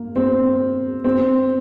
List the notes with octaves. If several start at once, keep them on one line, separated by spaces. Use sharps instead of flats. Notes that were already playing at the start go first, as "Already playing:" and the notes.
Already playing: A#3
C4
C4